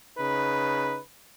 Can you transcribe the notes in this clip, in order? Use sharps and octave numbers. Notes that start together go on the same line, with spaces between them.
C#3 D#4 B4